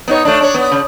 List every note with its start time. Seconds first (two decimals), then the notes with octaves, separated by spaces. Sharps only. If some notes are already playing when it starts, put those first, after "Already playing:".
0.08 B3 D#4 C#5
0.25 A3 D4
0.41 D4 C#5
0.54 B3
0.72 C#3